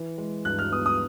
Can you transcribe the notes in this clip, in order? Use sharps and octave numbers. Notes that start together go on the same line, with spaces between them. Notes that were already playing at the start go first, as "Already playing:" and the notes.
Already playing: E3
G#3
G2 F#6
F6
B3 D#6
D#6